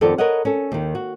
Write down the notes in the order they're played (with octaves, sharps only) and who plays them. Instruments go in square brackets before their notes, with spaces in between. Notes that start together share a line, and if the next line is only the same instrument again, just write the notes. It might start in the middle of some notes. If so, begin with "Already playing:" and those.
[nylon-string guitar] F2 D#3 B3 A4 D5
A#4 B4 C#5 D#5 F#5
C#4 A4
D#2 D#3
F#4